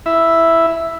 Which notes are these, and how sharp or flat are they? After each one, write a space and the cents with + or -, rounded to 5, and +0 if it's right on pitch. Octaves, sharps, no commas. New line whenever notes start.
E4 +0 E5 +0